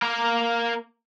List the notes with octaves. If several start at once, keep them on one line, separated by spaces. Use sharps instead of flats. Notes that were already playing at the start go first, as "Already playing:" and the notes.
A#3 A#4